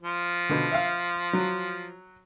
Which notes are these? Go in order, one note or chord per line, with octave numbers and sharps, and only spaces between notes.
F3
B2 D3
E5 F5
F#3